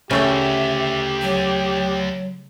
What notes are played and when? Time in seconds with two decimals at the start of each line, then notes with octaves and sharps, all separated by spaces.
0.11 D2 C#3 A3 G4 E5 G5
1.22 F#3